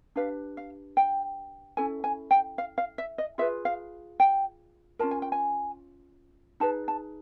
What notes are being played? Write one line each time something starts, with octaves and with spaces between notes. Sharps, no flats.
D4 G4 B4 F5
F5
G5
C#4 E4 A4 G#5
G#5
G5
F5
F5
E5
D#5
F4 G#4 B4 E5
F5
G5
C#4 F4 A#4 A5
G#5
G5
G#5
D#4 G#4 B4 A5
A5